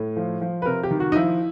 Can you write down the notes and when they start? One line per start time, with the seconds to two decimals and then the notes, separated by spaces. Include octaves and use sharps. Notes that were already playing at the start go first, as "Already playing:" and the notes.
Already playing: A2
0.17 F3
0.41 F3
0.62 B4
0.66 C3 A#4
0.83 G4
0.91 D#3
1.00 F#4
1.12 D#4
1.16 F3 E4